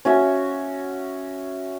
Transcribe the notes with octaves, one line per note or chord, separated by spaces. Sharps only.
C#4 F#4 E5